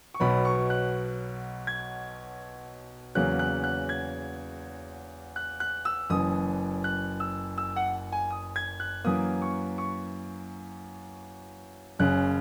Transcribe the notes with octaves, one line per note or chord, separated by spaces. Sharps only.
C#6
B1 B2 F#3 B3 B5
C#6
F#6
G#6
E2 C#3 F#3 A#3 F#6
F#6
F#6
G#6
F#6
F#6
E6
F#1 F#2 E3 D#6
F#6
E6
E6
F#5
G#5
D#6
G#6
F#6
F#2 E3 A#3 D#6
C#6
C#6
F#1 F#2 C#3 F#6